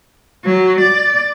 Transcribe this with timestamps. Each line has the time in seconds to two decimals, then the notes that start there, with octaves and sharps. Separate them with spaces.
0.45 F#3
0.81 D5